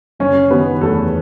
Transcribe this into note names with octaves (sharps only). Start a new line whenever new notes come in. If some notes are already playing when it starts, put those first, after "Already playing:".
F#1 C#4 C#5
D#3 B3 B4
E2 A3 A4